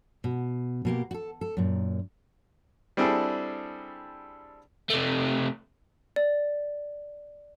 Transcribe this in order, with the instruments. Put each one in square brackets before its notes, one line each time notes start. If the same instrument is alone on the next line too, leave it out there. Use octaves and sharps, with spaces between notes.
[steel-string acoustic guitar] B2
B2 A#3 G4
F#4 A4
A4
F#2 A#2
[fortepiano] G3 C4 D4 E4 G#4 A4
[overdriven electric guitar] C3 A3
[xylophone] D5